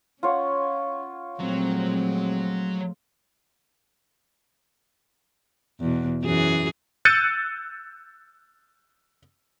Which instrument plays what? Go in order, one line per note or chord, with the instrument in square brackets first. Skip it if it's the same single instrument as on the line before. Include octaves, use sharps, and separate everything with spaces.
[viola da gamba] C#4 [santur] F4 C#5 F#5
[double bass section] A#2 C4 [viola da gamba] F3 G#3 A3 [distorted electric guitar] F#3
[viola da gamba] E2 B2
F#2 E3 G#4
[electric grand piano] E6 F#6 G6 A6 C#7 D#7